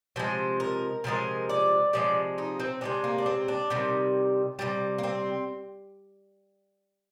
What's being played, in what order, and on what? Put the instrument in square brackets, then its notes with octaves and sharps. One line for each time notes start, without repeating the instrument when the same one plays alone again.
[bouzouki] C3 F3 G#3 C5
A#4
C3 F3 G#3 A#4
D5
C3 F3 G#3 D5
D#4
C4
C3 F3 G#3 D4
A#3
D4
C4
D4
C3 D#3 G3
C3 D#3 G3
A#3
C4